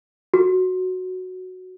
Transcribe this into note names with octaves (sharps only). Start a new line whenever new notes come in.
F#4